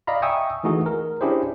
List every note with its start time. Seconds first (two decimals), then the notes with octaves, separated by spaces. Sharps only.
0.07 D5 D#5 F5 A#5 B5
0.22 E5 G5 G#5 C#6 D#6 E6
0.64 E3 A3 D#4 F#4 G#4
0.86 A#4
1.21 C#4 D4 E4 G4 G#4 C5